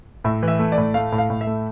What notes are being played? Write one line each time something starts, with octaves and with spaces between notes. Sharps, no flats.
A2 E5
E3
E5
A3
D5
A2
A3 F5
A2
F5
A2
E5
A3